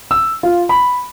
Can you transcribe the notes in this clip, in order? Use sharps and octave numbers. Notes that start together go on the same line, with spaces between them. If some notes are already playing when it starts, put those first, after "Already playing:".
E6
F4
B5